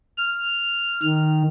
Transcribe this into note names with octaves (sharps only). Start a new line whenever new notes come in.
F6
D#3